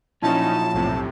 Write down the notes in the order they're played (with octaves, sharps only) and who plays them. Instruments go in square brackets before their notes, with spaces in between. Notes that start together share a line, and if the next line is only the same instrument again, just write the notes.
[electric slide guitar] A#2 F3 F#3 [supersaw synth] C#4 D#4 [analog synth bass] E4 [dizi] A5
[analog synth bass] B1 [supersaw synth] F2 A2 C3